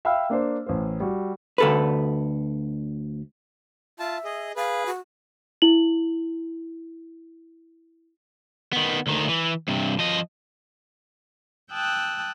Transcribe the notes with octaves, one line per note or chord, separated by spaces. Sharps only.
E5 F5 G5 B5 E6 F6
A#3 D4 C5
A1 C5
G3 F#4
D2 A4 B4
F4 E5 A5
G#4 D#5
G#4 B4 F5
F#4
E4 F#7
D#3 B3
D2 D#3
E3
G2 C3
F3 D#5
G5 A5 D#6 E6 F#6